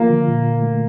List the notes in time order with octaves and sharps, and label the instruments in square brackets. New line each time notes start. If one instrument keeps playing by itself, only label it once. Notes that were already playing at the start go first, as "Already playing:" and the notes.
Already playing: [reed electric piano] F3 F4 [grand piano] A#3
[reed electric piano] D3
A#2
A#2
A3